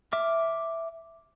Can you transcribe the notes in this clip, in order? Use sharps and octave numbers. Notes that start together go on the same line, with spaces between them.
E5 D6 F6